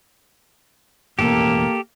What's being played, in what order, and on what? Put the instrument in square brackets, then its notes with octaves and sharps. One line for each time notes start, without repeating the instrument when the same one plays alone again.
[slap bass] E1 A1 F2 [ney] A#3 [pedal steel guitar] G4 A4